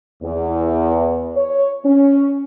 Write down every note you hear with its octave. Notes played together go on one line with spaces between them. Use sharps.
E2
C#5
C#4